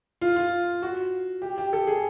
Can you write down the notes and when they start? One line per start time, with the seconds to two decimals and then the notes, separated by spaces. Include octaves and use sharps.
0.21 F4
0.36 F4
0.83 F#4
1.42 G4
1.58 G4
1.73 A4
1.87 G#4